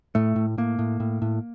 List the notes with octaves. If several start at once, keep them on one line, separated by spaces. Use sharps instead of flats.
A2 A3
A2
A2 A#3
A2
A2
A2